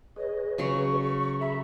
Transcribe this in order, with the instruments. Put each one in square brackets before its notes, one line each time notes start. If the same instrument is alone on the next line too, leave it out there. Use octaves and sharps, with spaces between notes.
[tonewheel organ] G#4 B4 C#5 [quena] D#5
[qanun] C#3 F#3 C6 [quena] C#6
[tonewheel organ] G#4 A#5 B5 [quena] E5